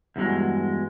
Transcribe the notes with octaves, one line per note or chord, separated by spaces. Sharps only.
E2 G2 F#3 G#3